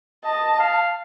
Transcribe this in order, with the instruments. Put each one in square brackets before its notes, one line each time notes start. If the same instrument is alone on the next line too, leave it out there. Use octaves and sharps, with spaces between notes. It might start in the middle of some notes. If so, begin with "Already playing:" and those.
[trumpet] D#5 [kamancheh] A5
[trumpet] F5